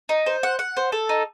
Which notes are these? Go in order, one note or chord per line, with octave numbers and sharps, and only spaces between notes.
D#4
C5
F#5
F#5
C5
A4
D#4